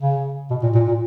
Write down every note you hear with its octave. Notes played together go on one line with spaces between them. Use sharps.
C#3
B2
A#2
A#2
A#2